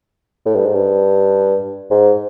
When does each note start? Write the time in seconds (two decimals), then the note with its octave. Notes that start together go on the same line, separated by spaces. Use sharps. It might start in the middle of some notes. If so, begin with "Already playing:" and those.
0.46 A2
0.55 G2
0.66 G#2
0.75 G2
1.91 G#2